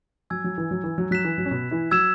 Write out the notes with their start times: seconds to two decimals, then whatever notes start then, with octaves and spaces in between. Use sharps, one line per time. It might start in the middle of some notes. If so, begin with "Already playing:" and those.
0.30 F#3 G#5 E6 G#6
0.44 F#3
0.58 E3
0.71 F#3
0.84 E3
0.98 F#3
1.11 F#3 F#6 B6 E7
1.25 E3
1.38 F#3
1.45 C#4
1.51 B2 B3
1.71 E3 E4
1.91 F#3 F#4 E6 G#6 E7